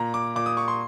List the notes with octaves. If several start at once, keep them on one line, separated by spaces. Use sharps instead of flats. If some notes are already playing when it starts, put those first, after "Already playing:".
Already playing: A#2 A#5
D6
A#2 D6
D#6
C#6
C6